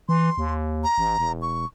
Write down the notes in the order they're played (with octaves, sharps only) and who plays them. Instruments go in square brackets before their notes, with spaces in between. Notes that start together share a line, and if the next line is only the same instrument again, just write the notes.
[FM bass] E3 [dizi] C6
[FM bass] D#2
[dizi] A#5
[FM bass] A1
E1
[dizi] C#6